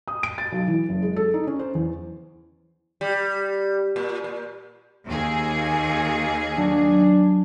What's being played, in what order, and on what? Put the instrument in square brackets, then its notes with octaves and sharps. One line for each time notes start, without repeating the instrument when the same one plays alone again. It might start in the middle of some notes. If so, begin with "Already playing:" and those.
[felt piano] D#6
D7
A6
B1
E3
F#1
G#3
A4
D#4
C#4
C5
E2
[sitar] G3
A#2
A#2
[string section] D#2 G#4
[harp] F#3 [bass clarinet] D4